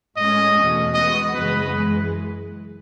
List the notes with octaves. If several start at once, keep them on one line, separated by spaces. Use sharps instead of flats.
A2 G#3 C#4 D#5
E2 B2 A3 C#4 F#4
E3 G#3 B3 F#4 D#5
F#2 C#3 E3 G#3 B3 B4
F#2 E3 G#3